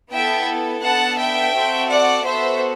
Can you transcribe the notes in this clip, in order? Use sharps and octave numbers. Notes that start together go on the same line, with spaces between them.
B3 E4 A4 E5 G5
B3 D4 A4 F#5 A5
E5 G5
C4 F#4 A4
D5 F#5
B3 F#4 A4 C5 E5